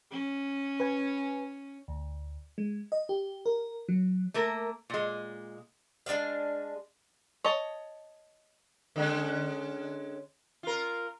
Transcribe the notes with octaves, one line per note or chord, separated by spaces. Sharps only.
C#4
B4 G#5
D2
G#3
D#5
G4
A#4
F#3
A3 A#3 A#4
A#2 G#3
G#3 D4 G#4 F5
C#5 D#5 A5
D3 G#3 C#4
F4 A#4